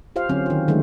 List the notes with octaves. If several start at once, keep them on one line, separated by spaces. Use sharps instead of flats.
F4 G4 C5 F5
D3 F#3 C4 C#4
D#3 F4
D3 D#3 F#3 G#3 A3 D4